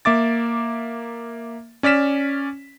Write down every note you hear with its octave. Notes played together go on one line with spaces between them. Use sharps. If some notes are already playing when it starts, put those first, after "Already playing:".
A#3 E5 D6 A6
C#4 D5 F6 B6 E7